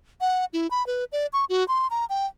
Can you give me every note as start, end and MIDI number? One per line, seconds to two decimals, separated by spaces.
0.21 0.45 78
0.53 0.70 64
0.71 0.85 83
0.87 1.05 71
1.12 1.27 74
1.33 1.45 85
1.49 1.66 66
1.68 1.87 84
1.90 2.05 82
2.10 2.26 79